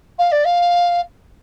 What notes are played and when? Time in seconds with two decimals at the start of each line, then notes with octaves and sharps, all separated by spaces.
0.18 F5
0.31 D5
0.44 F5